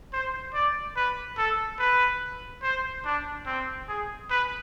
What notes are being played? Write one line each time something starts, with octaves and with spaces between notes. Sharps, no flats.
C5
D5
B4
A4
B4
C5
D4
C4
G#4
B4